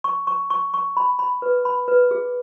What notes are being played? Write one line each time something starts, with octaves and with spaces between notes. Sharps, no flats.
C#6
C#6
C#6
C#6
B5
B5
B4
B5
B4
G#4